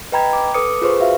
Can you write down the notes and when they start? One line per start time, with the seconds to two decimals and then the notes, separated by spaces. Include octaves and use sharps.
0.12 B4 D#5 G5 A#5 B5 G#6
0.33 D6
0.54 A4 B4 D6 D#6 C#7
0.82 F4 G#4 B4 C5 C#6
1.00 F#4 E5 F5